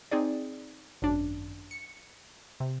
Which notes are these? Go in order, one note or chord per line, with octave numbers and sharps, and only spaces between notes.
C4 D#4 G#4 D5
G#1 F#2 D4
C#7
C3